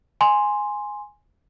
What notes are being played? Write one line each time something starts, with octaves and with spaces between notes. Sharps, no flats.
G#5 C6